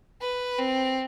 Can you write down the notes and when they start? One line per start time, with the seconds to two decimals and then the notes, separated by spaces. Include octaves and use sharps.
0.21 B4
0.59 C4